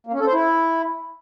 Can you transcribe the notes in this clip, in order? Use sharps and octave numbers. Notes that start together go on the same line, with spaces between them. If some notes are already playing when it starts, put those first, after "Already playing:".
A#3
C#4
A4
C5
E4